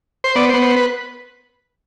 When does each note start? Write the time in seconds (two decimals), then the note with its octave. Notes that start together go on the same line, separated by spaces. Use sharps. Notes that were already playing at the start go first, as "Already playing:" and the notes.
0.24 C5
0.35 B3 D5
0.49 C5
0.54 B3
0.62 C5
0.76 B4